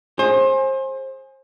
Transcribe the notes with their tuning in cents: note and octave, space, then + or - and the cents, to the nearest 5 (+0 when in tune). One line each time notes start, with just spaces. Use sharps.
G#4 +0 C5 +30